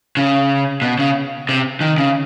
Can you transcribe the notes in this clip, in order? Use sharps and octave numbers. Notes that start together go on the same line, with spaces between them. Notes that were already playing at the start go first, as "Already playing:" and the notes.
C#3
B2
C#3
C3
D#3
C#3